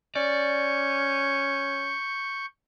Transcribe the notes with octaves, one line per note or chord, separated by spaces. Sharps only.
C#4 D5 C#6 G6